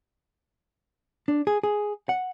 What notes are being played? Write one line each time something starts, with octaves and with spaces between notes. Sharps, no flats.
D4
G#4
G#4
F#5